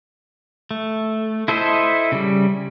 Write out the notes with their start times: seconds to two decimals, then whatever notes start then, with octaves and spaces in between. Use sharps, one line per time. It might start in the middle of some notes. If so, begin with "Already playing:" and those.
0.71 A3
1.48 E4 A4 C5 D#5 E5
2.12 C#3 G3